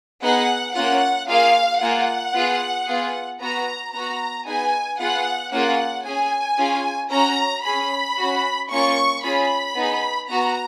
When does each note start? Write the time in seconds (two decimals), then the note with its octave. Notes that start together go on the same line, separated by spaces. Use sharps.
0.22 B3 D#4 G#4 F#5
0.74 A#3 C#4 F4 F#5
1.28 A#3 F4 G#4 F5
1.80 A#3 F4 G#4 F#5
2.33 B3 F4 G#4
2.87 B3 F4 G#4
3.40 B3 F#4 A#5
3.92 B3 F#4 A#5
4.46 B3 D#4 G#4 G#5
4.99 B3 F4 G#4 F#5
5.51 A#3 C#4 F4 G#4 F#5
6.04 C#4 G#4 G#5
6.58 C#4 F4 G#4
7.11 C#4 F#4 A#5
7.64 C#4 G#4 B5
8.17 C#4 F#4
8.69 A#3 C#4 F4 C#6
9.23 C#4 F4 G#4 B5
9.76 B3 D#4 G#4
10.29 B3 F#4 A#5